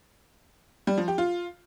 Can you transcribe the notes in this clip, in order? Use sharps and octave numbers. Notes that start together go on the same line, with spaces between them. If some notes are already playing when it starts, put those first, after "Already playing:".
G3
F3
G4
F4